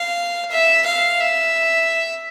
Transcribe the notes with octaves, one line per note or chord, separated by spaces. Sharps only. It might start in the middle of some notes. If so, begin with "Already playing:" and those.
Already playing: F5
E5
F5
E5